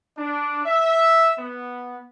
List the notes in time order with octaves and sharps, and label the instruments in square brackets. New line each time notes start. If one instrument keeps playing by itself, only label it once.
[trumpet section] D4
E5
B3